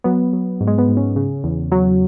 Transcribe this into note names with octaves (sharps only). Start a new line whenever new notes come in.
F#3 B3
F#3
G#2
G#3
B3
G#2
C#4
C#3
E2
F#3